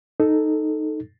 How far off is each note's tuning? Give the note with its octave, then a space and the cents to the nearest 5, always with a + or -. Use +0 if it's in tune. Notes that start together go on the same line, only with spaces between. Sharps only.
D#4 -5 A4 +0